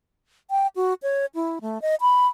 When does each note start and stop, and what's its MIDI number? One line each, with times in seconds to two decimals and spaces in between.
0.50 0.67 79
0.76 0.94 66
1.03 1.26 73
1.35 1.59 64
1.61 1.81 57
1.82 1.95 75
2.01 2.27 83